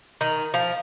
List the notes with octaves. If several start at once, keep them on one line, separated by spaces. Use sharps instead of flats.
D#3
F3